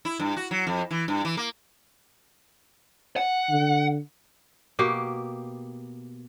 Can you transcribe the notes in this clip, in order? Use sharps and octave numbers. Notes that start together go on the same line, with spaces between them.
E4
G2
F#4
F#3
F2
E3
G2
E3
A#3
F#5
D3
B2 A#3 G4